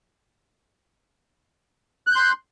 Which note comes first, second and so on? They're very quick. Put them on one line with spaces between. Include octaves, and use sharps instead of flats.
F#6 G6 C6